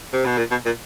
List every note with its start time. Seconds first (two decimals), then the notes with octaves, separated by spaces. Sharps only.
0.13 C3
0.25 B2
0.37 A#2
0.51 B2
0.65 A#2